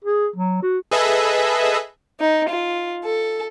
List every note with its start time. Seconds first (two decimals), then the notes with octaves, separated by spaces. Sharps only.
0.05 G#4
0.36 F#3
0.63 F#4
0.91 G#4 A4 B4 D#5 E5
2.20 D#4
2.49 F4
3.04 A4